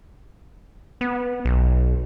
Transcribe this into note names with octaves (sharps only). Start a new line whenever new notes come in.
B3
B1